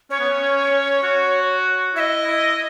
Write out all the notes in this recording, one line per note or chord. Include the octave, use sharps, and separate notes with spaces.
C#4 C#5
B3
C#4
C#4
C#4
F#4
E4 D#5 E5
E4